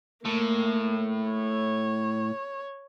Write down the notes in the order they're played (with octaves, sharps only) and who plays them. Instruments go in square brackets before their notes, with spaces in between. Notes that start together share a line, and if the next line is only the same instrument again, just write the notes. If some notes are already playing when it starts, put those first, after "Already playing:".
[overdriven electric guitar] A2 [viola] A#3
[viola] C#5